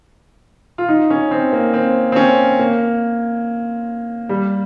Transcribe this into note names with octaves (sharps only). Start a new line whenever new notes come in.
F4
D#4
C#4
C4
A#3
C4
C4
C#4
A#3
G3